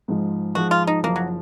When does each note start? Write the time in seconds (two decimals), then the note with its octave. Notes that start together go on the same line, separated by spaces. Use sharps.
0.08 G#2 F3 G#3
0.55 G#2 F3 G#3 F#4
0.71 F4
0.87 D#4
1.03 F#1 F#2 F3 A#3
1.16 F#3